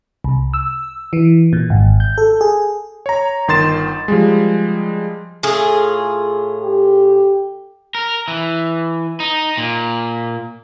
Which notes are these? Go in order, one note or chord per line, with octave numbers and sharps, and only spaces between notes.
C2
E6
E3
A#2
G#1
G6
A4
G#4
C#5 A#5
G1 D#3 C6 A6 E7
F3 G3 G#3
A2 F4 G#4
G4
A#4
E3
D#4
A#2